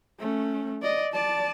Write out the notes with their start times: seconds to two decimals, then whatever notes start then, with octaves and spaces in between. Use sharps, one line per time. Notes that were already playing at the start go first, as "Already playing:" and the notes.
0.20 A3 C#4
0.82 D5 D#5
1.13 D5 A5